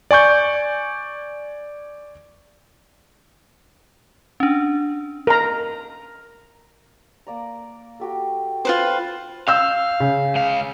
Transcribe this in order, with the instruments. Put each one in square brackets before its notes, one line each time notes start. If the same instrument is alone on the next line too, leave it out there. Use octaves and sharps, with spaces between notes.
[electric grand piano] D5 G#5 C#6 G6
[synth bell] C#4 D4
[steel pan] A#4 A#5
[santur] A#3 D5 A#5
F#4 G4 A4
[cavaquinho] F4 B4 C5 [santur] G5
[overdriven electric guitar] F5 [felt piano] E6 G6
[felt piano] C#3
[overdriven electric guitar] C#2 F5